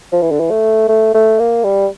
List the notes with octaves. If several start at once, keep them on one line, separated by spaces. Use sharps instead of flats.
F3
E3
D3
E3
A3
A3
A3
A#3
G3